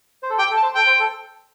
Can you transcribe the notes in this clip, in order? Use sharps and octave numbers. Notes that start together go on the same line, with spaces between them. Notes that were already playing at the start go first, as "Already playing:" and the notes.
C5
A4
G4 G5
A4
A5
C5
A4 G5
C5
A4